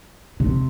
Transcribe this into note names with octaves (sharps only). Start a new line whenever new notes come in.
C3